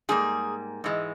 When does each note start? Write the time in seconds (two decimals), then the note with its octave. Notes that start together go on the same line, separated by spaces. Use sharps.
0.09 G#2 G3 A#3 G#4
0.84 G#2 E3 G#3